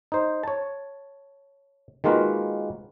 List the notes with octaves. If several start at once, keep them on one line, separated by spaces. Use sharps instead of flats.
D#4 C5
C#5 A5
D#3 G#3 A#3 F4 F#4 B4